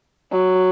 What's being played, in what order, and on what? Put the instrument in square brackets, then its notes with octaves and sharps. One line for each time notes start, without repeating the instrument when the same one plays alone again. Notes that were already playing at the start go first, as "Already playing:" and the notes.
[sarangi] F#3